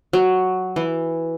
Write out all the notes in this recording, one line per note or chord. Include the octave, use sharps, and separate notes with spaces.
F#3
E3